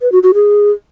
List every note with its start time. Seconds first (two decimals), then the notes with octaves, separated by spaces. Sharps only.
0.01 B4
0.12 F#4
0.23 F#4
0.34 G#4